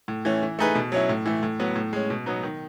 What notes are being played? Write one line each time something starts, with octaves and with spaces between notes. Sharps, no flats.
A2
E3 A3 C#4
E3
A3 D#4 G#4 B4
B2
F#3 C#4 E4
A2
E3 A3
A2
F#3 B3
A2
G#3 C#4
B2
F#3 B3 D#4
D#3